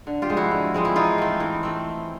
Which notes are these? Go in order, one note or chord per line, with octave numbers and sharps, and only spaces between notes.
D3
F4 G4
F3 G#3 C4
E4 F#4
D3
F3 G#3 C4
E4
E3 D#4 F4
A3 C4
E3
A3 C4